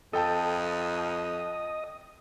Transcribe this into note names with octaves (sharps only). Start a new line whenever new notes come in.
F2 A4 D#5 G5 A5